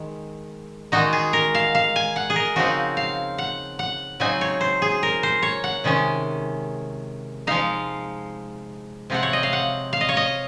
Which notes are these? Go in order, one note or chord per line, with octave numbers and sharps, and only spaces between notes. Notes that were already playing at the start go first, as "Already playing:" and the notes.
Already playing: D#3 G#3
D#3 G#3 D#4 F#4
G#4
A#4
F5
F5
G#5
F#5
G#4
A#4
C#3 F3 C4 D#4 F#4
F5
F#5
F#5
C#3 F#3 C4 D#4 G#5
C#5
C5
G#4
A#4
C5
C#5
F#5
C3 D#3 G#3 C#4
F3 G#3 D#4 F5
C3 F3 C4 F#5
C#5
D#5
F5
F#5
F5
D#5
C#5
D#5